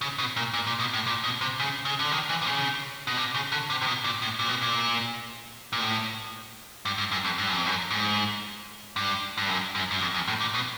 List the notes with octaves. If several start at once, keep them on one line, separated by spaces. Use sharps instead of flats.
C#3
B2
A#2
A#2
A#2
B2
A2
A#2
B2
C3
C#3
C#3
D3
D#3
E3
C3
C#3
B2
C3
C#3
D3
C3
C3
B2
A#2
A2
A#2
B2
A#2
A#2
A2
G2
G2
F#2
F2
G2
F#2
F2
F#2
G#2
G2
G2
F#2
F#2
F#2
F2
E2
A2
A#2
B2